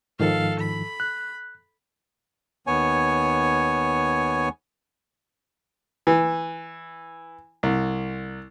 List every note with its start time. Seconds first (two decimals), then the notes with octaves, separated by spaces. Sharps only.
0.20 G#2 D#3 F3 A4 F5
0.60 B5
1.00 F#6
2.67 D#2 B3 C#5 G#5
6.07 E3
7.63 C2